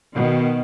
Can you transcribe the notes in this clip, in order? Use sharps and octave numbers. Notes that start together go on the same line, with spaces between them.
B2 D#3